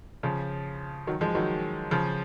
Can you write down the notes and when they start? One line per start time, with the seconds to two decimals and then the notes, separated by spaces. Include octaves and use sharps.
0.23 C#3 F3
1.07 D#3 F#3
1.21 F3 G#3
1.35 D#3 F#3
1.91 C#3 F3